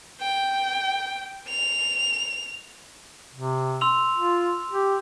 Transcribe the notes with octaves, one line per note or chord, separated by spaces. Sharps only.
G5
F7
C3
C6 E6 F7
F4
G4